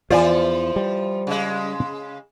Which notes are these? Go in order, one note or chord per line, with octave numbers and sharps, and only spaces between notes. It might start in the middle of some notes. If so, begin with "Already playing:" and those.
E2 E3 F3 F4 C5 D5 G#5
G3
C#3 G#3